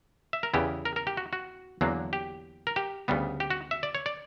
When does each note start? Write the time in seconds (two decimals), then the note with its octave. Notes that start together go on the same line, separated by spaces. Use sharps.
0.33 E5
0.43 A#4
0.54 E2 C#3 E3 B3 E4 G4
0.85 A#4
0.96 A#4
1.07 G4
1.17 F#4
1.33 F#4
1.81 E2 D3 F#3 A#3 D4
2.13 G4
2.67 A#4
2.76 G4
3.08 D2 C#3 G3 B3
3.40 G4
3.50 F#4
3.71 E5
3.83 D5
3.95 C#5
4.06 D5